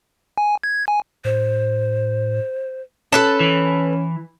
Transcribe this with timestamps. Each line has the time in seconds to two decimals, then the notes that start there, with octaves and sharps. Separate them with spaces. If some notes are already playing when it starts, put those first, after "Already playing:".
0.38 G#5
0.63 G#6
0.88 G#5
1.25 A2 C5
3.12 C#4 A4 B4 A5
3.40 E3